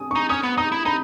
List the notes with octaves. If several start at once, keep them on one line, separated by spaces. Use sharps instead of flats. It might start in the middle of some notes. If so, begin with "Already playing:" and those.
Already playing: G#5 D#6
D#4 C#6
C#4 D#6
B3
D#4 D#6
E4
D#4 B5